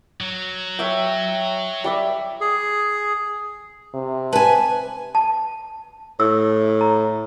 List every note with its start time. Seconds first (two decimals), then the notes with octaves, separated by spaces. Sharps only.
0.21 F#3
0.79 C#5 E5 G5
1.84 G3 D5 E5
2.41 G#4
3.94 C3
4.33 B4 G#5 A5
5.15 A5
6.20 A2 E6
6.81 A#5